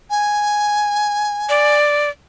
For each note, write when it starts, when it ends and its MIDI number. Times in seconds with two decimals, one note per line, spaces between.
0.10 1.77 80
1.49 2.10 74